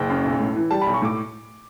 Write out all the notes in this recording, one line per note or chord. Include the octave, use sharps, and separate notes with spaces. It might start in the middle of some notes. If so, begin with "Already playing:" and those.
Already playing: F#1 G5
F#2
B1
A2
E3
G3 A5
B1 B5
C#6
A2 D6